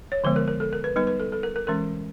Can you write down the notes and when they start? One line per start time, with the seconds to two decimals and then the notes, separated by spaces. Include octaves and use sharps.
0.12 C#5
0.24 D3 F3 G#3 B3 C5
0.36 A#4
0.48 A#4
0.60 A4
0.73 A#4
0.84 B4
0.96 G3 B3 D#4 B4
1.07 B4
1.20 A4
1.32 A4
1.43 A#4
1.56 A#4
1.67 E3 G#3 C#4 A#4